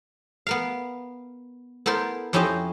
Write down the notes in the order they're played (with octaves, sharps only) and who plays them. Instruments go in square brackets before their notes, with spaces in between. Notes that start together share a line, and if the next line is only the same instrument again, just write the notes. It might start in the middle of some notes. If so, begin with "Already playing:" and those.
[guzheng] B3 A#4 F5
B3 E4 A4 A#4 C5
F2 C#4 E4 G4 C5 D#5